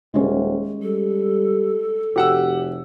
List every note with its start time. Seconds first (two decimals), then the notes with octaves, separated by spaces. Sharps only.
0.14 D#1 G#3 C#4
0.83 G3 A4
2.16 F1 F#4 G4 F#5 E6